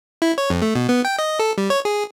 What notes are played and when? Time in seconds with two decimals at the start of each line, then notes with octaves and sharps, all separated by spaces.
0.22 E4
0.38 C#5
0.50 F2
0.62 A3
0.75 B2
0.89 B3
1.05 G5
1.19 D#5
1.39 A4
1.58 G3
1.70 C#5
1.85 G#4